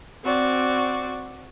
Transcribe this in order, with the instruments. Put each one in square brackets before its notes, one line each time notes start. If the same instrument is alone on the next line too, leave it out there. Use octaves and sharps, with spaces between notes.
[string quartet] C4 F#4 D5